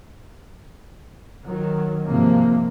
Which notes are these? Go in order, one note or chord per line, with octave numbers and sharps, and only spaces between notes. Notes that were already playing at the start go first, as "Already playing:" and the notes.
D#3 F#3
G#2 C3 F3 A#3